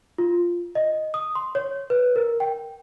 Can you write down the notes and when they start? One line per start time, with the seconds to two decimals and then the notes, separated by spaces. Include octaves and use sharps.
0.18 F4
0.75 D#5
1.14 D#6
1.35 C6
1.55 C#5
1.90 B4
2.16 A#4
2.40 G5